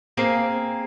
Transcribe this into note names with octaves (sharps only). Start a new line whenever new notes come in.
A#3 C4 G#4 F5